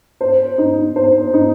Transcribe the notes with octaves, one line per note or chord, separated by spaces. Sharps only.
C5
D#4
C5
D#4